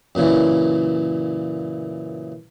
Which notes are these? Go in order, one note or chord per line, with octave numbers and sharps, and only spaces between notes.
F#2 A#2 C#3 E3